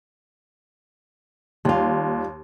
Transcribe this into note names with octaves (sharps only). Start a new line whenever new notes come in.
D#2 G3 F4